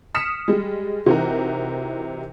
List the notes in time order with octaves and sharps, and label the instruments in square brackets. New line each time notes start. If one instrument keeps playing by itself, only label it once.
[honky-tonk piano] D#6 F6 B6 C#7 E7
G3 G#3
C3 E3 D#4 F#4 A#4